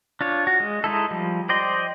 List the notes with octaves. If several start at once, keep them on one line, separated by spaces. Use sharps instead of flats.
D4 F4 C#5
F#4
G#3
G#3 D#4 E4 A4
F3 G3
C5 D5 D#5 G5 C6